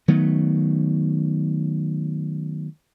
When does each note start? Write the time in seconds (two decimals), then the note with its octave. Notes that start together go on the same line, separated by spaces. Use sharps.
0.08 D#3 F#3 A3 B3